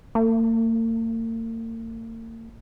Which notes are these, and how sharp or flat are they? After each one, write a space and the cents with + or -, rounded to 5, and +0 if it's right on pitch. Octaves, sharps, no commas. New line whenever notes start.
A#3 -45